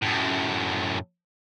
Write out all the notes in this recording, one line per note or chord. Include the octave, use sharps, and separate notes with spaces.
F#2 A2